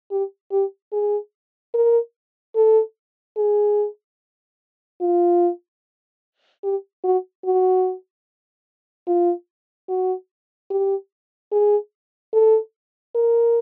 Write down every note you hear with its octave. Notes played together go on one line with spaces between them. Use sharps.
G4
G4
G#4
A#4
A4
G#4
F4
G4
F#4
F#4
F4
F#4
G4
G#4
A4
A#4